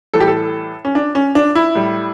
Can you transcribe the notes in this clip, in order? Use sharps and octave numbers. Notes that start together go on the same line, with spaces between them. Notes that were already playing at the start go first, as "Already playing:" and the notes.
A2 E3 G3 A4
G4
A4
C#4
D4
C#4
D4
E4
A2 G3